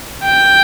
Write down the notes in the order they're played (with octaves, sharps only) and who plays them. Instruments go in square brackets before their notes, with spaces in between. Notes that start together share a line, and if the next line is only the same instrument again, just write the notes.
[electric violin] G5